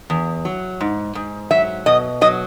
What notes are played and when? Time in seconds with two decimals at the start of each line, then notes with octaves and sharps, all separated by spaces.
0.10 E2
0.45 F#3
0.81 G#2
1.15 G#2
1.51 F#3 E5
1.86 B2 D#5
2.21 F#3 D#5